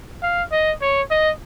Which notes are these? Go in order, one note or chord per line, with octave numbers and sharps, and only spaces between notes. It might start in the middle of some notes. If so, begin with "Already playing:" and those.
F5
D#5
C#5
D#5